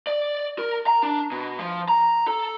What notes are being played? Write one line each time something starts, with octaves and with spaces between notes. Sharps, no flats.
D5
A#4
A#5
D4
B2
F3
A#5
A4